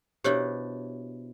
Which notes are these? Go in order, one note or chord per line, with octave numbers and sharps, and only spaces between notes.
B2 D4 E4 G4 C5 C#5